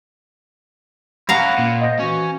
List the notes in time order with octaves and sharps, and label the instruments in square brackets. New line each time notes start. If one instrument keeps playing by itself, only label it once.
[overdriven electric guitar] C#4 E4 [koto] F5 A#5 [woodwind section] F#5
[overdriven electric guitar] A#2
[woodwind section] C5 D#5
[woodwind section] E3 F#4 [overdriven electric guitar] C#4